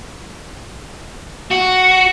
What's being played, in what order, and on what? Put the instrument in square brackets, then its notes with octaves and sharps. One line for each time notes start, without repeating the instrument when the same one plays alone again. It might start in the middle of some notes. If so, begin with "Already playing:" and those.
[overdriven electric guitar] F#4